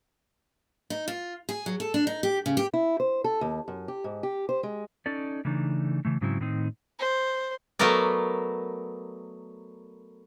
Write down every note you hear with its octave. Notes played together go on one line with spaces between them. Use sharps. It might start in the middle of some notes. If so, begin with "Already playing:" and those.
D#4
F4
G#4
F#3
A4
D4
D#4
G4
C#3
G4
E4
C5
A4
D#2
F#2
G4
G#2
G4
C5
G#3
C#4 D#4 A4 D5
C#3 E3 A3 D4 D#4
C#3 E3 A3
G#2 C#3 F#3 C4 E4
A2 D#3 C4 D#4
C5
F#3 A3 B3 A#4 D5